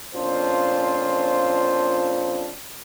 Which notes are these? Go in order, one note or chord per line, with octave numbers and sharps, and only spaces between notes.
F2 A#2 C#4 D4 F4 C5